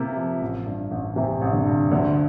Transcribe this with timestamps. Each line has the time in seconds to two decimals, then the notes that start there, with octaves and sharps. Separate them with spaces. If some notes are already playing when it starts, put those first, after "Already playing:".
Already playing: C3 A#3 E4
0.17 F3
0.41 A1
0.66 G2
0.91 A1
1.16 C3 E3
1.41 A1
1.53 D3
1.66 G2
1.91 D2 D3